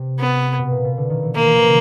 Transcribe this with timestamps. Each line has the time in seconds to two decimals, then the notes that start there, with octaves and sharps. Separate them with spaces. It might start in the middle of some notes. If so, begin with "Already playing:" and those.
Already playing: C3
0.20 B3
0.59 B2
0.71 A#2
0.84 B2
0.97 D3
1.10 D#3
1.23 E3
1.36 D#3 A#3
1.46 E3
1.55 F3
1.65 C#3